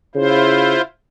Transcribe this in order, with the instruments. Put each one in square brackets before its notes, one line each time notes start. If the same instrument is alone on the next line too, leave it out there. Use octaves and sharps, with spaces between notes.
[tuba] C#3 [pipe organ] E4 F4 C5